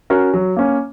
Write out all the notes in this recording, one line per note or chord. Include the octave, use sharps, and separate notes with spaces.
C#4 F#4 A#4
F#3
A#3 C#4